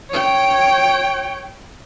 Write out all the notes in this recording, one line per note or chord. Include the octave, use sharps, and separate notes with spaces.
C#5 G5